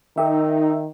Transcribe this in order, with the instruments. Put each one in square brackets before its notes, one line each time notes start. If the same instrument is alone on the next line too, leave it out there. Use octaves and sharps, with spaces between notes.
[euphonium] D#3 [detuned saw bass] D#4 [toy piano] A#4 G5 D6 [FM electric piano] E5